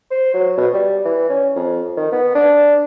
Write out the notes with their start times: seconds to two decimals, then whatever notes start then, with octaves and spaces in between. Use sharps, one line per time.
0.11 C5
0.34 F#3
0.57 B2
0.74 G3
1.05 E3
1.29 C#4
1.56 F2
1.97 D#3
2.12 B3
2.35 D4